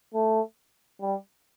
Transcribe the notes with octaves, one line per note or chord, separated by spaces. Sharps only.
A3
G3